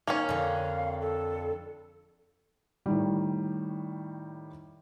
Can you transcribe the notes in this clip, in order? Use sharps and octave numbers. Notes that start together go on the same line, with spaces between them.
D#3 A#3 C#4 C#5
F2 D3 F5
A4
A2 D#3 G3